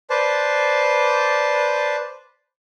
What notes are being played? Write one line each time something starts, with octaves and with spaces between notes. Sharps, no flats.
B4 C5 D5 A5